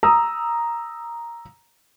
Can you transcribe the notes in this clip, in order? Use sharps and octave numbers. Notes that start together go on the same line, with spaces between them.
A#5 D#6 E6